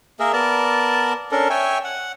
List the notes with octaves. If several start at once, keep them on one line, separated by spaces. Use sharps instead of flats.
A#3 G#4 A#4 E5
B3 A#4 D5 A5
C#4 D4 A4 A#4
C#5 E5 G5 G#5
F#5